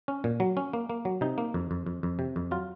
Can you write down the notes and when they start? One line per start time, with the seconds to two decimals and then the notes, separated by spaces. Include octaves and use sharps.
0.08 C#4
0.24 A#2
0.40 F#3
0.57 C#4
0.73 A#3
0.89 A#3
1.05 F#3
1.21 C3 D#4
1.38 A#3
1.54 F2
1.71 F2
1.86 F2
2.03 F2
2.19 C3
2.36 F2
2.51 F#3 F4